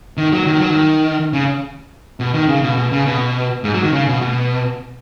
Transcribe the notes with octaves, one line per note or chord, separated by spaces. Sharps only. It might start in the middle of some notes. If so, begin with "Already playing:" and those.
D#3
F#3
D#3
F#3
D#3
C#3
B2
D#3
C#3
B2
B2
C#3
B2
G#2
F#3
D#3
C#3
B2
B2